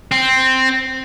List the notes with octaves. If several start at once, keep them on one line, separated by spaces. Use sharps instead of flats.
C4